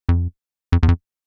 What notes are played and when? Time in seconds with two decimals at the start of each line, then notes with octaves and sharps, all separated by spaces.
0.09 F2
0.72 F2
0.83 E2
0.88 F2